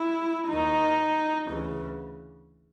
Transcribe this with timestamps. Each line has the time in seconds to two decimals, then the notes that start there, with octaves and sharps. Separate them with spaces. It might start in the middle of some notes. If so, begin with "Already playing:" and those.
Already playing: E4
0.48 D#2 D#3 D#4
1.48 D2 C#3 E3